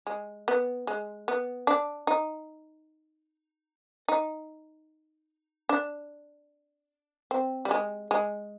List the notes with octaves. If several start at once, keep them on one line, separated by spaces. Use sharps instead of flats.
G#3
B3
G#3
B3
D4
D#4
D#4
D4
C4
G3
G#3
G#3